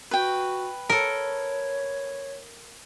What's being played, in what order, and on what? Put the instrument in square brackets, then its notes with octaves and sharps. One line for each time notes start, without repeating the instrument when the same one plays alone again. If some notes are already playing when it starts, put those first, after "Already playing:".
[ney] F#4 [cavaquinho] B4 G5
[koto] A4 A#4 [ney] C#5